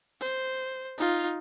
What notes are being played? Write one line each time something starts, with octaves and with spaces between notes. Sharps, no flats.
C5
D#4 F4